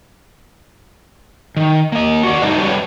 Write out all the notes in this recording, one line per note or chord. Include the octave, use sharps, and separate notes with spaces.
D#3
A#3 D#5
F#4 D5
G#3 D#4 E4 A4 B4 D#5
G3 F#4 G4 A4 B4 C#5